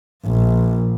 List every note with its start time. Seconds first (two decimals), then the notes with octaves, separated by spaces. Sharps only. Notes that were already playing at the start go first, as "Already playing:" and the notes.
0.25 A#1